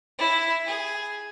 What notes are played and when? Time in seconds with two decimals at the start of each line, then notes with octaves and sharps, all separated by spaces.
0.18 E4
0.66 G#4